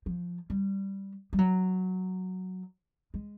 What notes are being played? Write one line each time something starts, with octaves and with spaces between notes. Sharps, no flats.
F3
G3
G3
F#3
G#3